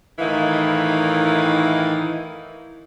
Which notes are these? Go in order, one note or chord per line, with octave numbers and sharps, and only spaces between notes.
A2 D#3 E3 D#4 E4 F5